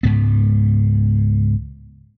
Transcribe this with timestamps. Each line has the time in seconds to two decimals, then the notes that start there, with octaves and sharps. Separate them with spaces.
0.03 C#2 G#2 B3